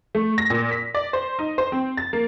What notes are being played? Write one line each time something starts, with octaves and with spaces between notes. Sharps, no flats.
A3
A#6
A#2
B6
D5
C5
D#4
C5
C4
A6
A#3